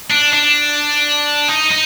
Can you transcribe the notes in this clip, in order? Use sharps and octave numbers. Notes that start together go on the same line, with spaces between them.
D4
D4
D#4
D#4